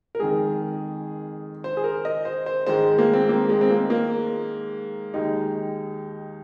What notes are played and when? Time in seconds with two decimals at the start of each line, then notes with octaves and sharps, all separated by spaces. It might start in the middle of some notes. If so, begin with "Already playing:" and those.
0.15 A#4
0.19 F2 D#3 G#3 G#4
1.64 C5
1.77 G#4
1.84 A#4
2.05 D#5
2.25 C5
2.46 C5
2.67 G#2 D#3 G#3 C5
2.98 A#3
3.13 C4
3.29 A#3
3.49 G#3
3.61 C4
3.70 A#3
3.90 A#3
5.14 D#2 D#3 G#3 D#4